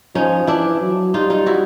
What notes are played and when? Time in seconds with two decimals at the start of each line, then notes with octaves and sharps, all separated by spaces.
0.15 F3 C#4 D#4
0.47 E3 D4 E4
0.81 F#3
1.14 G3 D#4 F4
1.30 D#4 F4
1.46 E4 F#4